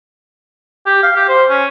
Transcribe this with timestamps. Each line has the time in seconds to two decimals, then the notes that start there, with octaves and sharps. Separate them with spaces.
0.87 G4
1.03 F5
1.16 G4
1.29 C5
1.49 C#4